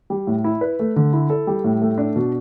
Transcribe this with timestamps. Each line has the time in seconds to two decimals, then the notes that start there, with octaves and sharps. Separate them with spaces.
0.10 G3
0.27 A2
0.44 E4
0.61 B4
0.79 A3
0.96 D3
1.13 E4
1.30 A4
1.47 G3
1.64 A2
1.82 A3
1.98 D4
2.16 B2